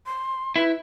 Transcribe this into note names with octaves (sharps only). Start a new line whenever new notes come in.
C6
E4 B4